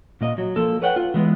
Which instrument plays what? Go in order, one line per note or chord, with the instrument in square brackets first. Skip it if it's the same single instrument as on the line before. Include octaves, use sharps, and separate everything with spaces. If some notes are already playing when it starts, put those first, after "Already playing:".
[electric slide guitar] A#2 A#3 D#5
F#3
F3 A#3 A4
B4 C#5 F#5 G5
F4
E3 G#3 B3